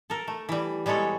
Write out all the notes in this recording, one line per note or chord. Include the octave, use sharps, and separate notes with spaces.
A4 A#4
A3
E3 G3
G3 G#3 B3 A4 C#5